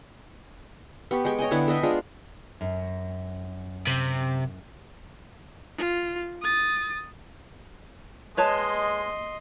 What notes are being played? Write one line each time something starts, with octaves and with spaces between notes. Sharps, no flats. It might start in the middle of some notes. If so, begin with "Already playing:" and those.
B3 G4 C#6
G#3 G5 C#6
C#5 D#5 G5 G#5
D3 B3 E4
A4 D#5 E5 G5
G#3 D4 F4
F#2
C3
F4
D#6 A6
G#3 B4 C#5 D#5 A5 C6